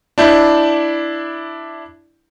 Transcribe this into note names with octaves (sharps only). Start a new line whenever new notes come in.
D4 E4 G6